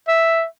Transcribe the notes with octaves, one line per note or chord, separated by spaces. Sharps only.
E5